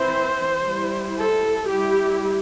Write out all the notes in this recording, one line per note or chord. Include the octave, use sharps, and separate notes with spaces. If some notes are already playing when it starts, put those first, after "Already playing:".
Already playing: E3 C4 E4 C5
G3 E4
A4
G3 E4 G4